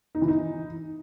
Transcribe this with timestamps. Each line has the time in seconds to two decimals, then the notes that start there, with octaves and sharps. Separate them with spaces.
0.15 D#4
0.21 E3
0.28 D#4